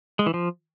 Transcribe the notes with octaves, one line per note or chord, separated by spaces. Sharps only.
G#3
E3
F3